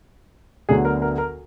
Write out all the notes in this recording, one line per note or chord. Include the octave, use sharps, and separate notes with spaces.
D2 D3 F#3 B3 G#4
A#4
A#4
A#4